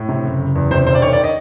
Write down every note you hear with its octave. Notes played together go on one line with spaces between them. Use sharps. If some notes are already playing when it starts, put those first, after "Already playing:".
Already playing: A2
C3
F#1
F#1
E2
C3 C5
E1 C5
D5
D#3 C#5
D5
D#5